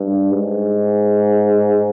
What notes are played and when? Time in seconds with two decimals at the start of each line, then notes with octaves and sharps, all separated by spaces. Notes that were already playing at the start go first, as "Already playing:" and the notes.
Already playing: G2
0.31 G#2